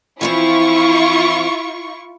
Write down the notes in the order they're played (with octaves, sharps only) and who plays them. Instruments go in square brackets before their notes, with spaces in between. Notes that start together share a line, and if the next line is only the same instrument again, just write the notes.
[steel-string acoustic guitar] E3 F3 C4 [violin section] E4 F4 C#6